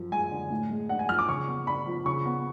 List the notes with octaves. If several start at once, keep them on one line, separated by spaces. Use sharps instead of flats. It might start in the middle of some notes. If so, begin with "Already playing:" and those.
Already playing: F#2 F3
G#3 G#5
D3
A2
G#3
D4 F#5
G#5
F3 F6
D6
C#3 C#6
B3
D4 B5
F3
C#3 C#6
B3